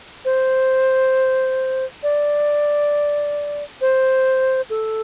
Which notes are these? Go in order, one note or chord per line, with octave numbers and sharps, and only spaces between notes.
C5
D5
C5
A4